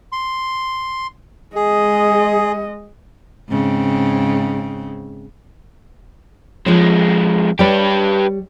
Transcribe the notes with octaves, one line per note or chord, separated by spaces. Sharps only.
C6
G#3 G#4 D#5
G#2 C#3 C4
F2 F3 G#3 C#5
G3 G4 B4 C#5